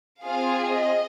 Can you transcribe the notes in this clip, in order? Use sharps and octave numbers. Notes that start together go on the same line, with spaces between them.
C4 F4 G#4 F5
D#5